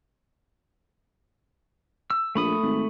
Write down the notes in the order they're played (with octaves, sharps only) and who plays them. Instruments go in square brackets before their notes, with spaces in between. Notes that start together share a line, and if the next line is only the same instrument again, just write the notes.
[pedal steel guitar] E6
[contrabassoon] A#1 [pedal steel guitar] A3 B5 D#6
[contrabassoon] G#1